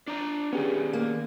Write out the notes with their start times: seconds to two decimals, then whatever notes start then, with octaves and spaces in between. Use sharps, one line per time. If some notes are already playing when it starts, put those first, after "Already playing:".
0.08 D4 D5 A#5
0.53 D#3 B3 C#4 G4 G#4
0.93 A#3